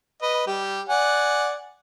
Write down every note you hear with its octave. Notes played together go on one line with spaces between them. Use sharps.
B4 D#5
G3 G4
D5 F#5 G#5